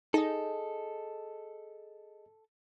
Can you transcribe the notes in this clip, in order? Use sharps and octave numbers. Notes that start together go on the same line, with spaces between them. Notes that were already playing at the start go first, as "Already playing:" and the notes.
D#4 G#4 A4 D#5